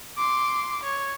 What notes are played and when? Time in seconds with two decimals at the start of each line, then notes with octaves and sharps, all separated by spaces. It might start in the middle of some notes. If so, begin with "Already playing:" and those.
0.18 C6 D6
0.83 C#5